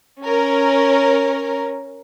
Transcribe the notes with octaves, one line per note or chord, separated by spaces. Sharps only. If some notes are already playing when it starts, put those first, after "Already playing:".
C#4 A#4